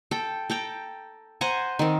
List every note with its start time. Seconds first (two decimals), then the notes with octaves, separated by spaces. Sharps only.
0.11 A4 G5
0.50 A4 G5 A#5
1.41 C5 F#5 G#5 A#5
1.79 D#3 C4